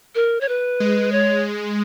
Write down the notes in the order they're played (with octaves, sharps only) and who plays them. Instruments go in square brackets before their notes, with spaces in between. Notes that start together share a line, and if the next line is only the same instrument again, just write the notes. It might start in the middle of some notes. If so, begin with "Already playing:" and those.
[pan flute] A#4
C#5
B4
[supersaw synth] G#3
[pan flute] C#5